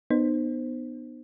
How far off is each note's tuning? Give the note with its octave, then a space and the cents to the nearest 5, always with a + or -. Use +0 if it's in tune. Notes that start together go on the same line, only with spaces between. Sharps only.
B3 +0 D#4 -30 C5 +0